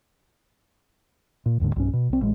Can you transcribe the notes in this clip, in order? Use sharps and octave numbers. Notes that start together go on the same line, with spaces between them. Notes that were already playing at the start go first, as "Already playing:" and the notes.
A#2
E1 D#2 G#2 D3
B1 G2 C#4
B2
B1 C4
A1 G#3